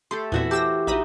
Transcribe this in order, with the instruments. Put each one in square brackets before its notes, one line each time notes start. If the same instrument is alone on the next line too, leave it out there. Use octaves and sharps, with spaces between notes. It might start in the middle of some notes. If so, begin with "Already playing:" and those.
[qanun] A3 G4 A4 [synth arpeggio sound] C6
[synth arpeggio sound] E2 A#2 C4 [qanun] E3 F#4 E5
[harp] G4 [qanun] C5 [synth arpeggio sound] A5 E6 A#6
[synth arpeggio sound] A#1 B5 D#6 [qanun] D#4 F#4 [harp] E5